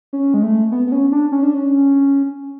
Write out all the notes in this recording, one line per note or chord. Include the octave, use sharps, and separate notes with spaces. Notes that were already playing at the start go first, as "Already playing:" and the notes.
C#4
G#3
A3
B3
B3
C#4
D4
C#4
D4
C#4